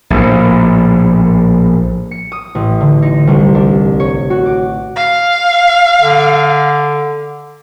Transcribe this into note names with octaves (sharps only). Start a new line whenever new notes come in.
A#1 A2
C#7
D#6
A1
D3
D#4
C2
D4
C#5
F#4
D6
F5
D3